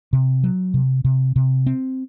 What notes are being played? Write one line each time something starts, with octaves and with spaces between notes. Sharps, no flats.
C3
F#3
C3
C3
C3
C4